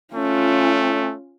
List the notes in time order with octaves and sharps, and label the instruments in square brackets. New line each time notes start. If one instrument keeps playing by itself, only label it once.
[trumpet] A3 [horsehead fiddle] C#4 F4